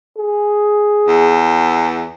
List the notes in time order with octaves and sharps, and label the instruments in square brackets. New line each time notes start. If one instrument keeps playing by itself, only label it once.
[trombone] G#4
[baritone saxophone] E2